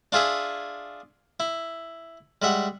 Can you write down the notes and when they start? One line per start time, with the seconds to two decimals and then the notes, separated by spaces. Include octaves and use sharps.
0.12 D4 F4 G#4 E5 G#5
1.40 E4
2.42 G3 G#3 E5 F#5